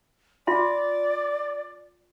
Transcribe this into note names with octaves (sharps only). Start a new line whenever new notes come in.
F4 D5 E5 C6